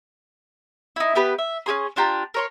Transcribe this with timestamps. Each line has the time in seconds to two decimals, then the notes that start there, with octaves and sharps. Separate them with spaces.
0.96 D#4 E4
1.15 B3 G4 B4
1.38 E5
1.66 C#4 G4 G#4 C6
1.96 D4 F4 G4 A#5
2.34 A#4 C#5 C6